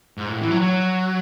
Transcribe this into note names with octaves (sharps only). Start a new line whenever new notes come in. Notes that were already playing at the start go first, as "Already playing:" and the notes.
G#2
A2
E3
F#3
F#3